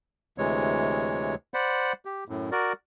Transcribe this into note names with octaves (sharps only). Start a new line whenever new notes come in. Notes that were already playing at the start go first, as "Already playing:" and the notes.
D2 C3 E3 G#3 C#5
C5 D5 F#5 B5
G4
F#2 A2
F#4 A#4 D5